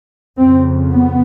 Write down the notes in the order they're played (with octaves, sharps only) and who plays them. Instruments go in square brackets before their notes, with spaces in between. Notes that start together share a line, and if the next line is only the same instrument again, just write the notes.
[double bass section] F2 C#3 C4
B3